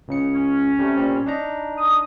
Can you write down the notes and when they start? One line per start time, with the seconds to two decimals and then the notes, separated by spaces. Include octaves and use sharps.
0.08 C#2 C#3 C#7
0.35 C#4
0.79 C3 G3 A3
0.97 A#2 G3 C4
1.26 D4 D#4 A#5
1.78 D#6